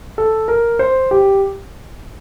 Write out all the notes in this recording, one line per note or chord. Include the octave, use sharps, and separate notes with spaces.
A4
A#4
C5
G4